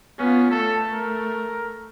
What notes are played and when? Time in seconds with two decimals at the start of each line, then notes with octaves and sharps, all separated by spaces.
0.19 B3 C#4 F4
0.51 A3 A4
0.93 A#4